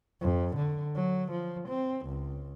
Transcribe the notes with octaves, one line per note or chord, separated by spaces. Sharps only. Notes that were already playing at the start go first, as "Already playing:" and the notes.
F2
D3
F#3
F3
C4
C#2